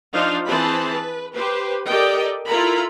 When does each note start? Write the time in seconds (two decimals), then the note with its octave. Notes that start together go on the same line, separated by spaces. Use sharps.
0.13 F3 D4 D#4 F4 C5 F5
0.46 E3 C4 G#4 C5 A5 B5
0.94 B4
1.34 G4 B4 C5
1.87 G4 A4 A#4 D5 D#5 G5
2.46 E4 F4 A4 A#4 A#5 B5